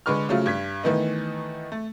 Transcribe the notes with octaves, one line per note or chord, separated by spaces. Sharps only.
D3 G#3 B4 C#6 F6
C#3 F3 F#3 A3 F4
G2 G#6 B6
D#3 E3 A3 B3 D#4
A3